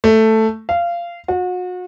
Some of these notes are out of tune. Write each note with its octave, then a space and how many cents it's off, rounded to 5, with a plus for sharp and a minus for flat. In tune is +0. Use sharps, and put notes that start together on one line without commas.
A3 +5
F5 -20
F#4 -35